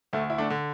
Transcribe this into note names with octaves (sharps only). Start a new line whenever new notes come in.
D2 A3
E4
A3 D4
D3